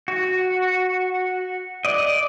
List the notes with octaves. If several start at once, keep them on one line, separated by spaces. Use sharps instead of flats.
F#4
D5 D#5